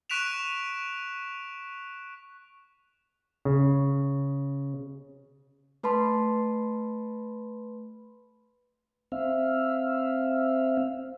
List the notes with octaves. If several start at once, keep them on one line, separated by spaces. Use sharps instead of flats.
C#6 F#6 B6 D7 E7 F7
C#3
A3 B4 A5 B5 C6
C4 E5 F5